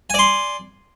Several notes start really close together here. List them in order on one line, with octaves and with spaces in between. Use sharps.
G#5 D5 C6